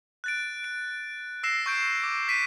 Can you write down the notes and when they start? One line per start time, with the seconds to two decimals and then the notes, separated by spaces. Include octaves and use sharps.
0.24 F#6 A6 D7
0.64 D7
1.43 E6 A#6 C7 E7
1.66 C#6 G6 D7
2.03 D6
2.28 G6 B6 D7 D#7